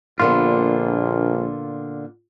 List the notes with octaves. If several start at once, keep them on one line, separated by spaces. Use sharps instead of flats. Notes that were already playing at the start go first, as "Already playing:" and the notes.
A#1 A#2 D3 B3 F4